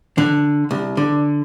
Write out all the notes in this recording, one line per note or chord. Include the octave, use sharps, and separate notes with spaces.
D3
C2
D3